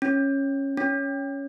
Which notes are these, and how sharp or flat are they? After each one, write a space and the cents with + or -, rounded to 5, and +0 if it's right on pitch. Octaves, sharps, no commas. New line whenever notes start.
C#4 -10
C#4 +5